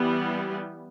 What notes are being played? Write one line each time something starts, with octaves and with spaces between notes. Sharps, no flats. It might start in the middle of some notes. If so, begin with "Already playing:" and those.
Already playing: E3 G3 B3